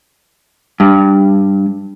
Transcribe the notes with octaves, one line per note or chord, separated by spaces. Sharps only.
G2